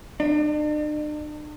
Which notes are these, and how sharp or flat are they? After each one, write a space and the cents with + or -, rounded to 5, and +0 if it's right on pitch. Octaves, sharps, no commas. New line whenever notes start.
D4 +40